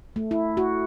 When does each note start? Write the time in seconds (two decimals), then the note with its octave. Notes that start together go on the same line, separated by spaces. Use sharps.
0.16 A3
0.31 E4
0.57 F#4